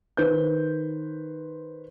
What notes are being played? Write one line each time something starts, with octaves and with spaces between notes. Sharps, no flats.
D#3 B4 C5 G6